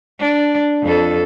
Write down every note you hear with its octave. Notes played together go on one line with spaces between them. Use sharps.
D4
F2 A4